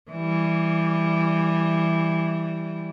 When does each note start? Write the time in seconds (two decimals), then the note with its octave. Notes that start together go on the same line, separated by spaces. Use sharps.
0.11 E3 G3